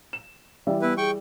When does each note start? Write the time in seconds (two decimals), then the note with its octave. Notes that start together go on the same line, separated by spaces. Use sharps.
0.13 E7
0.67 E3 G3 D5 E5
0.82 B3 E4 B4
0.98 G#4 G5 C#6